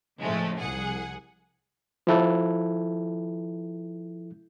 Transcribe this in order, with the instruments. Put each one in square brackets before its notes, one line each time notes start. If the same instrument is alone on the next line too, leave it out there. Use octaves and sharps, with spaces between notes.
[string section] A2 C#3 F3 G#3 A3
C2 G#4 F#5
[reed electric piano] F3 E4 A4